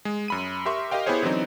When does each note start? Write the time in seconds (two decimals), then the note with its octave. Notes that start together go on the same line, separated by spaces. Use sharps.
0.05 G#3
0.28 F#2 B5 D#7
0.65 G4 A#4 E5 C6 C#6
0.91 G4 A#4 D#5 F5 G5
1.06 B3 E4 G4 G#4 C5 C#5
1.23 D3 E3 F#3 C4 D#4